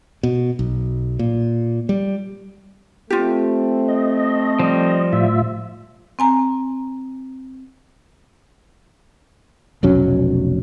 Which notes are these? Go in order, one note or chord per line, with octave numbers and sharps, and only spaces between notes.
B2
B1
A#2
G3
A3 C4 F4 G4
D#5
F3 G3
A2 F4 E5
C4 G#5 A#5
F1 B1 F#3 C#4